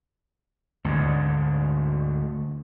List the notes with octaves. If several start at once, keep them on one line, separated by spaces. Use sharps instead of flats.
D2 G#2 D3